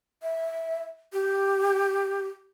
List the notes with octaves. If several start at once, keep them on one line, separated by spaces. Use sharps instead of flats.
E5
G4